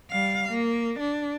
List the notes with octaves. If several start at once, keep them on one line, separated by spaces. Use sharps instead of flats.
G3 F5
A#3
D4